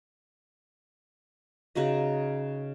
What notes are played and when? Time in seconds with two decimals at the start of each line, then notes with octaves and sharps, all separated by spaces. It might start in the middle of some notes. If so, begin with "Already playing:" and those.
1.75 C#3 D#4 F#4 D#5